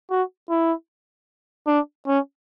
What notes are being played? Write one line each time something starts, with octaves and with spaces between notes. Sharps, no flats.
F#4
E4
D4
C#4